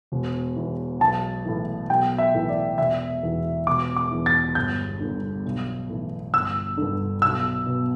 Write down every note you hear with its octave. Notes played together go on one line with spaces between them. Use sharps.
E1
E2 E3
B1 A5
A2 E3
B1 G5
E5
A2 E3
D5
E1 E5
E2 E3
E1 D6
D6
E2 E3
A6
G1 G6
G2 D3
B1
A2 E3
G1 E6
G2 D3
B1 E6
B2